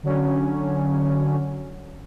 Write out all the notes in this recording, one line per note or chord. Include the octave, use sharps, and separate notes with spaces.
D3 F#3 C#4